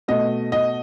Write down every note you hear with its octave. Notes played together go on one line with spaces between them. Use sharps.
B2 A3 D#5
D#5